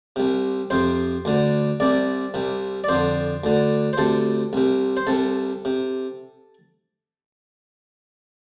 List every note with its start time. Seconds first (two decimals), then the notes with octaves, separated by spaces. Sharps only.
0.16 C2 C3
0.70 F2 C3 C5
1.25 D2 D3
1.80 C2 C3 D5
2.34 C2 C3
2.84 D5
2.89 F2 D3 C5
3.44 D2 D3
3.93 C5
3.98 D2 C3 A4
4.53 C2 C3
4.97 C5
5.07 C2 C3 A4
5.65 C3